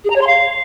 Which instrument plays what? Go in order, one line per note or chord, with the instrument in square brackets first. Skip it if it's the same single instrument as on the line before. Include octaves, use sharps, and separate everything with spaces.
[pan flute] G#4
A#5
C#5
C6
F5